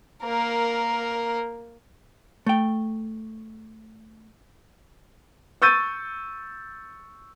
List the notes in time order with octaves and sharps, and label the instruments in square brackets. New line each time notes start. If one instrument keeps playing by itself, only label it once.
[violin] A#3 A#4
[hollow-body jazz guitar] A3 G5
[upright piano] C#6 E6 G6 A6 D#7